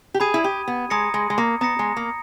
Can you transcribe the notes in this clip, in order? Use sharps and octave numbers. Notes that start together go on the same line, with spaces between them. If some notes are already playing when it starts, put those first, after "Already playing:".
G4
G#4 B5 D#6 G#6 D#7
E4
G4
B3
G#3 A#5 D#6 A#6 C#7
G#3
G#3
A#3
B3 A#5 D#6 A#6 C#7
G#3
A#3